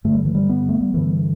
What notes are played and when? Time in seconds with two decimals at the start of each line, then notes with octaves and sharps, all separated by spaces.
0.04 G2 D3 A3
0.15 G3
0.25 E3
0.35 G3
0.49 B3
0.69 A3
0.81 G3
0.94 G2 D3 E3